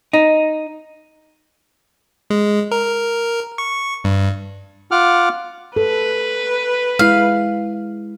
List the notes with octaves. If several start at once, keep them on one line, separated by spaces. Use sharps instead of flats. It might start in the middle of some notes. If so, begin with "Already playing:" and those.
D#4
G#3
A#4
C#6
G2
F4 F#5 D6 F6
A4 B4
G#3 E4 F5